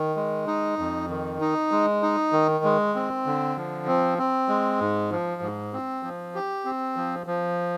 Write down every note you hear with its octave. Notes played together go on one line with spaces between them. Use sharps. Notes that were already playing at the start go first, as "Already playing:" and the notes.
Already playing: D#3
G#3
D#4
F2
D#3
D#4
G#3
D#4
D#3
G#3
C4
D3
F3
C4
C4
G#3
G#2
F3
G#2
C4
F3
G4
C4
F3
F3